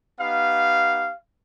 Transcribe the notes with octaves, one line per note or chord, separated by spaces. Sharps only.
B3 D#4 G4 F5